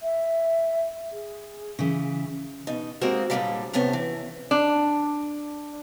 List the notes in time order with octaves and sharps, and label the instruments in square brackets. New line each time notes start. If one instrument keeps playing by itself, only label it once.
[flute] E5
G#4
[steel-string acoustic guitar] C#3 E3
B2 D#4
G#3 A#3 C4 F#4
F#2 A#2 D3 E3 F#3 G3
A2 C3 A3 B3 C#4
E3
[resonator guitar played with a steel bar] D4